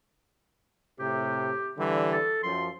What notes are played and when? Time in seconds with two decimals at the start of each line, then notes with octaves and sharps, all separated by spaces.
0.99 A2 C3 G4
1.77 D3 E3 G3
2.12 A4
2.43 F#2 F3 C6